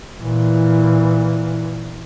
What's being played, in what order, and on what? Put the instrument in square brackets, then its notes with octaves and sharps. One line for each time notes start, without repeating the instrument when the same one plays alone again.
[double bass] A#2 E3